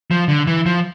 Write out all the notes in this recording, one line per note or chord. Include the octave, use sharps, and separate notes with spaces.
F3
D3
E3
F3